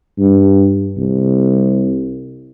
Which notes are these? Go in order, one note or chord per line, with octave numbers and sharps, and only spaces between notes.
G2
C2